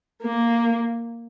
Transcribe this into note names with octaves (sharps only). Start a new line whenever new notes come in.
A#3